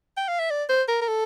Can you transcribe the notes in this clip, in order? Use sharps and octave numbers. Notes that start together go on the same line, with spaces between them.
G5
F5
E5
D5
C5
A#4
A#4
A4